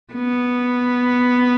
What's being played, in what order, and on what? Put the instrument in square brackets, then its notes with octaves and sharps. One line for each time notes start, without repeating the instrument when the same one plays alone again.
[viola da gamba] B3